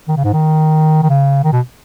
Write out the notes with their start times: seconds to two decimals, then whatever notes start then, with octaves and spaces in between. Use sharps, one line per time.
0.08 D#3
0.17 C#3
0.24 G#2
0.33 D#3
1.03 D#3
1.10 C#3
1.44 D#3
1.53 B2